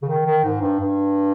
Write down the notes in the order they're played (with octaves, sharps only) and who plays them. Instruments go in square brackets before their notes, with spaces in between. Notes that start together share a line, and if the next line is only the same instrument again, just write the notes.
[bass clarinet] C#3
D#3
D#3
G#2
G2
G2